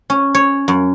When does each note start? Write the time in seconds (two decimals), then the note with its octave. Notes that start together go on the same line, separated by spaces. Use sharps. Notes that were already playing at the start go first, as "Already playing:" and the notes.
0.10 C#4
0.35 C#5
0.68 F#2